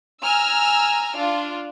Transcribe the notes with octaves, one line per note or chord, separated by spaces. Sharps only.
G#5 A#5 E6 F6
D4 F4